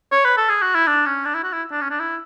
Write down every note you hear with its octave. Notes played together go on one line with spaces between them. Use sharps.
C#5
B4
A4
G#4
F#4
E4
D4
C#4
D4
E4
F#4
E4
D4
C#4
D4
E4